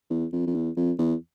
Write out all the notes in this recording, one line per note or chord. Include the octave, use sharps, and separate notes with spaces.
E2
F2
F2
E2
F2
E2